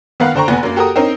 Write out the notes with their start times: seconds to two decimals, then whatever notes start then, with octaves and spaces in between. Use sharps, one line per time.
0.20 D#3 B3 A#4 F5 F#6
0.35 D3 A4 C5 G5 A#5 C#6
0.48 F1 B3 G#5
0.63 F#2 A#3
0.76 F#4 G4 A4 A#4 A#5 D#6
0.96 C4 C#4 D#4 A#4